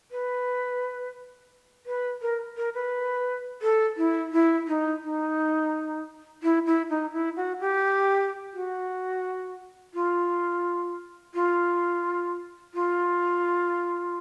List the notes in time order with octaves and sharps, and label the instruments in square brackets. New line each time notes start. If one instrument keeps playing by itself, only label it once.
[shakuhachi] B4
B4
A#4
A#4
B4
A4
E4
E4
D#4
D#4
E4
E4
D#4
E4
F#4
G4
F#4
F4
F4
F4